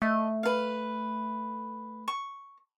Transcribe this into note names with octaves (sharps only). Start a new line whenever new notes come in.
A3 D#5
B4 F5
C#6